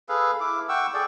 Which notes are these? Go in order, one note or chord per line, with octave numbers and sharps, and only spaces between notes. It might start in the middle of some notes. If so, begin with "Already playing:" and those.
G#4 A4 B4 F5
E4 D6
F#5 G5 C#6 E6
G#4 A4 D5 G5